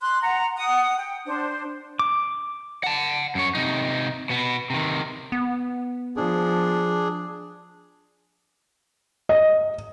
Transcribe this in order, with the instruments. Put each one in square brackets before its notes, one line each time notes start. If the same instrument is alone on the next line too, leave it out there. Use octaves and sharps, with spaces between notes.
[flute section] C6 F#6
F#5 A#5
F#5 D#6
G5
D4 C5
[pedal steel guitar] D6
[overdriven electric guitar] F#5 A5
F#2 C#5
C3 D#4
B2 B3
C3 D#3
[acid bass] B3
[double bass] F3 [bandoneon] D4 G#4
[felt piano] D#5